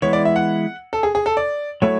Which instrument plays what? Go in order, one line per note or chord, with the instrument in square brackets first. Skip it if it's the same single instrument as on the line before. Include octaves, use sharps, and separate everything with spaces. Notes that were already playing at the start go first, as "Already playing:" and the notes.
[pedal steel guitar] E3 G#3 B3 E4 [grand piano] C#5
[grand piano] D5
E5
F#5
A4
G#4
G#4
A4
D5
[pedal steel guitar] F#3 A3 E4 [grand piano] C#5